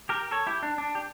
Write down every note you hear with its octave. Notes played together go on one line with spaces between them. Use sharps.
G4 A#4
A4 C#5
E4 G4
D4
D4
G4